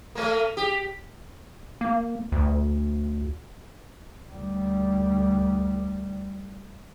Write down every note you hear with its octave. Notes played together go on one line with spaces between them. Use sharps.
A3 A#3
G4
A#3
D2
D2 G3